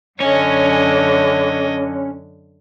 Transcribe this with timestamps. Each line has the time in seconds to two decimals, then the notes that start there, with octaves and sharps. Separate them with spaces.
0.20 F#2 D3 C#4 C#5 D#5